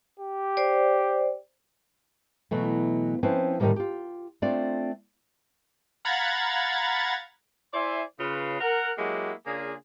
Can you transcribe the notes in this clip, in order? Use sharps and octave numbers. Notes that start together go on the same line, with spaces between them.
G4
C5 D5
B2 E3 F#3 A3
F3 C4 C#4 E4 B4
A2 D3 D#3 F3 G3 A#3
F4 G4
A3 C4 D4 F4 D5
F5 F#5 A#5 B5 G#6 A6
E4 C5 D5 E5 G#5 C6
C#3 F4 B4
A#4 F#5
F#3 G#3 A#3 E4 F#4 G4
C#3 A#3 D4 F4 G#4